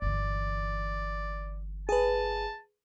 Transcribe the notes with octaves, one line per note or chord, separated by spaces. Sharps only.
G1 E3 D5
G#4 B4 A5